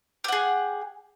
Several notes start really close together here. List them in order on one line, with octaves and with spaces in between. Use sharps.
G4 F#5 G#4